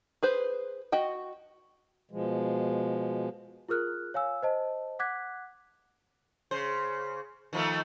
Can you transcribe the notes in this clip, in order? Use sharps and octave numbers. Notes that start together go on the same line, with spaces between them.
G#4 B4 C5
F#4 D#5 G5
B2 F3 G#3
F4 G#4 A#4 F6 F#6
C#5 F5 G#5 E6
C5 D#5 A5
F#5 D6 F#6 G#6 B6
C#3 C5
D#3 F3 A3